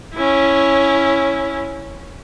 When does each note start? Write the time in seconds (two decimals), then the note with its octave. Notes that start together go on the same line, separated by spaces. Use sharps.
0.15 C#4 E4